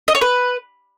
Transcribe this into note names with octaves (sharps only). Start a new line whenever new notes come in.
D#5
C#5
B4